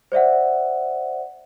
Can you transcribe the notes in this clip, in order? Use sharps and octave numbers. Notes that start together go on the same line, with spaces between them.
C5 D5 E5 F#5